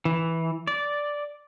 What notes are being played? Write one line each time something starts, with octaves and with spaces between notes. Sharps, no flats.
E3
D5